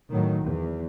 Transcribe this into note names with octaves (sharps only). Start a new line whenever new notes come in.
A2 D#3 F#3
E2